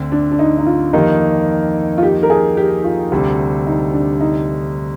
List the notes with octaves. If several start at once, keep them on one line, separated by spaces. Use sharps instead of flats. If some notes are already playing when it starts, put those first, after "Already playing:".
Already playing: D2 C4
D4
D4
D#4
D#4
F4
F2 D#3 A#3 D#4 G4
F4
G4
A#4
G#4
G4
F4
D2 C3 G3
D#4
D4
D#4